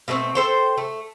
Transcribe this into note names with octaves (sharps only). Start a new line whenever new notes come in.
B2 A3 A#3 C4
A4 C5 G5
A3